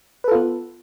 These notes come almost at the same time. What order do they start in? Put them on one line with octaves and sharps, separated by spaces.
B4 A4 F4 B3